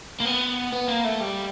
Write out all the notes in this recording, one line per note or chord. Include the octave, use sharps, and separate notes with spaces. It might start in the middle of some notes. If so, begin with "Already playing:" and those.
A#3
B3
B3
A#3
A3
G3